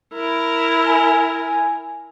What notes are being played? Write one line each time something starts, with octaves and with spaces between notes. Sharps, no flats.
E4 A#4
G#5